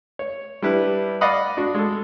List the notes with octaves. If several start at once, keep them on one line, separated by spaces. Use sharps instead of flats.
C#5
G3 D4 E4 B4
D5 D#5 F5 F#5 B5 D#6
D4 F#4
G#3 A4